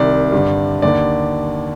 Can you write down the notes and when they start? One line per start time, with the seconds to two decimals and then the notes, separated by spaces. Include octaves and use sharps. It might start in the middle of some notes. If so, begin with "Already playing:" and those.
Already playing: C2 C3 D#3 D5
0.32 G2 D3
0.82 D#2 D3 D5